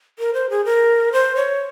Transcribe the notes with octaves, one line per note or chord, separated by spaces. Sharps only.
A#4
C5
G#4
A#4
C5
C#5